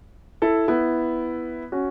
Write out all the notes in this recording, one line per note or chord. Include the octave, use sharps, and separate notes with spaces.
E4 A4
B3 E4
C#4 F#4